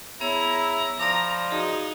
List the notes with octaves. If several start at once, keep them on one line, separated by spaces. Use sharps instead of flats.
B3 E4 G#4 C#5 A#5
F3 D5 A#5 B5 D6
D#4 F#4 G#4